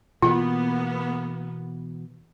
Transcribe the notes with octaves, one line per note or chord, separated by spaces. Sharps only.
B2 E3 A#3 B3 F4